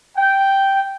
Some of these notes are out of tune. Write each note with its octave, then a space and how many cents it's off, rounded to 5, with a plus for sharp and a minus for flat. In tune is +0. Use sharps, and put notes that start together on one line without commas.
G5 -5